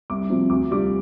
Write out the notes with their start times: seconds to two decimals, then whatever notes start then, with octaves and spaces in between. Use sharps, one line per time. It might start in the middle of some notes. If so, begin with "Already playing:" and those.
0.10 C2 D6
0.30 C3 F3 C4
0.50 D2 D6
0.70 C3 G3 D4 F4 D6